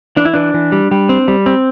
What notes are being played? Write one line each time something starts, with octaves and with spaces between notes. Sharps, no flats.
E3 D4
E4
E3 D4
E3
G3
G3
C4
G3
C4